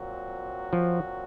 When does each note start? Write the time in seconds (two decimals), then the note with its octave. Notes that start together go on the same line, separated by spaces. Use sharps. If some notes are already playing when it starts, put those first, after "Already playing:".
Already playing: A#2 F#3 C4 F#4
0.73 F3